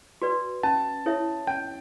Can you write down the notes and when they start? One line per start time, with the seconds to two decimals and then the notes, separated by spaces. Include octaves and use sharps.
0.22 F#4 B4 D5
0.63 C#4 A5
1.06 E4 A4 C#5 E5
1.47 C#4 G5